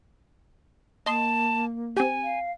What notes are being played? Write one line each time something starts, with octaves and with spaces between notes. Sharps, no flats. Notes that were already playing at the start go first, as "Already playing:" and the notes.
A#3 D#5 A5 C6
C4 G4 G#5
F5